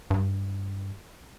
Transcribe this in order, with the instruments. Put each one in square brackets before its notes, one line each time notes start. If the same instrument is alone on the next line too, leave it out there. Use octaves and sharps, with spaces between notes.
[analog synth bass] G2